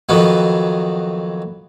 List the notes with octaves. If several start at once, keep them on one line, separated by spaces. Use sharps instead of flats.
F2 D#3 F#3 B3